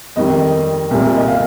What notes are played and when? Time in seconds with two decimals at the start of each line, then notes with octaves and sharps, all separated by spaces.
0.16 F2 D#3 G3 D#5
0.91 C2 A#2 G3
1.16 D#5
1.28 F5